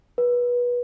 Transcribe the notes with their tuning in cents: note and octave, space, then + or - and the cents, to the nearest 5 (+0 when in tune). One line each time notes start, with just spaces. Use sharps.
B4 -25